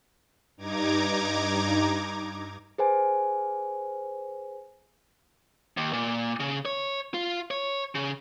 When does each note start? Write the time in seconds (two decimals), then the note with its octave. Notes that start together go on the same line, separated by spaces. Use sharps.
0.57 G2 D#4 A#5 D6 G#6
2.78 G#4 B4 C5 G#5
5.77 D#2
5.93 A#2
6.40 C#3
6.65 C#5
7.14 F4
7.51 C#5
7.95 C#3